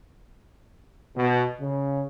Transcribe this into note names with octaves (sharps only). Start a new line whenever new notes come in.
B2
C#3